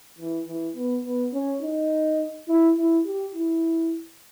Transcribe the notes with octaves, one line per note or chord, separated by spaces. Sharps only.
E3
E3
B3
B3
C#4
D#4
E4
E4
G4
E4